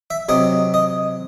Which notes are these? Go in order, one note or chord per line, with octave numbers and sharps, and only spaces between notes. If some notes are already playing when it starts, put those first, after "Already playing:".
E5
C3 F#3 C4 D#5
D#5